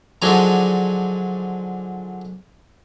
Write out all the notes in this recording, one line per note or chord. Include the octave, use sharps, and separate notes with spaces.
D3 F3 F#3 G#3 D4 D#4